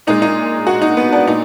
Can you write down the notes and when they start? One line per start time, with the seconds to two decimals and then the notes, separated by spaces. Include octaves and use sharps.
0.07 A#2 G#3 D#4
0.22 D#4
0.67 F#4
0.82 D#4
0.97 B3
1.12 D4
1.27 A#2 D#4